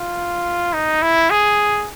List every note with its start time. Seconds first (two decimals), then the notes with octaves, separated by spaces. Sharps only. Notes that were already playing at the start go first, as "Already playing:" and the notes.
Already playing: F4
0.73 D#4
1.02 E4
1.30 G#4